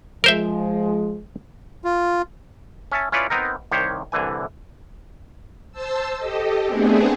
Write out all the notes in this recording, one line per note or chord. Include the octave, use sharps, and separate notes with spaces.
F3 G#3 A#4 C5 E5
F4
C#4 E5 A5
C#4 E4 F4 B4 C#5 D5
B3 C4 D#4 A#4
C2 D#3 G4 C5 C#5
C2 D3 E3 G#5
C5 A5 E6
G4 A4 D#5
A3 B3 C4 D4 G#4